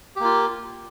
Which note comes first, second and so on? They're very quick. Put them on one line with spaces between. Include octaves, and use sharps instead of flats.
G4 A#3 F4